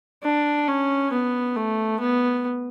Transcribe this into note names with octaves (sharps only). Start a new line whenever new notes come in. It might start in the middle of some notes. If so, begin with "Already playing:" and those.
D4
C#4
B3
A3
B3